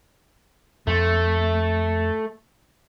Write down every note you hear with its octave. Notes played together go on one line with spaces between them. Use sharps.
F2 A3